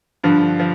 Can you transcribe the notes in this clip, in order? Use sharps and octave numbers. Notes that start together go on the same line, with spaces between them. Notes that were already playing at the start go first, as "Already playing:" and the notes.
G2 D3 F3
F3